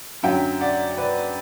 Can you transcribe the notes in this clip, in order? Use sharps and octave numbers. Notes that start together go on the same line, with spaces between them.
F#2 D3 F#3 E5 G5
D5 F#5
B4 D5